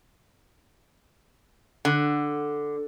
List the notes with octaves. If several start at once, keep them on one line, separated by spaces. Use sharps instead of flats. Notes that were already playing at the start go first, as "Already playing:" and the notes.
D3